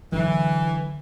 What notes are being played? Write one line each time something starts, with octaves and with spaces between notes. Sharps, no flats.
D3 E3 F#3